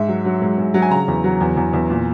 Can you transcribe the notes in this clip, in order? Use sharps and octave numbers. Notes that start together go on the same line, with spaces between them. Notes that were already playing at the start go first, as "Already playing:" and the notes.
Already playing: G#2 E5
F#3
F#3
G#2
G#2
F#3
G#5
C#3 A#5
E2
F#3
E2
E2
E2
A#2